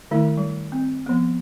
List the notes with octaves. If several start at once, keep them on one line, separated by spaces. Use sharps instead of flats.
D#3 A3 E4
G3
C4
F3 B3